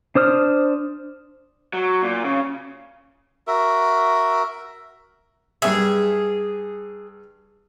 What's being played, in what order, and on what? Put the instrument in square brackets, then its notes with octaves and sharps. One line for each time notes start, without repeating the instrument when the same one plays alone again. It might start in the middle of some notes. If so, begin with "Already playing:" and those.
[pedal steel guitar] D4 C5 D#6 F6
[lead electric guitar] F#3
A#2
C#3
[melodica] F#4 A#4 E5
[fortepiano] G2 E5 [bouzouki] G#4